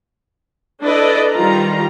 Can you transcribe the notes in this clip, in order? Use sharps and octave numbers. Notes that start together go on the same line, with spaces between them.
D4 E4 A4 B4 D5 D#5
D#3 G3 F4 A#5